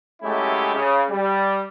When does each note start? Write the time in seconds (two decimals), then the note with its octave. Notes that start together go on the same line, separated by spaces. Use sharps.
0.23 F#3 G#3 A3 C#4 E4 G4
0.74 C#3
1.09 G3